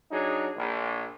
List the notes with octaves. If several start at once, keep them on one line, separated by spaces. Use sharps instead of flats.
F#3 D4 D#4 G#4
A#1